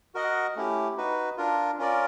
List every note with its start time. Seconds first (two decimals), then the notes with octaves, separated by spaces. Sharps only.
0.14 F#4 A#4 D#5 F#5
0.56 A3 C#4 E4 G4
0.97 D#4 F#4 B4
1.37 D4 F4 A#4
1.78 C#4 F4 A#4 D5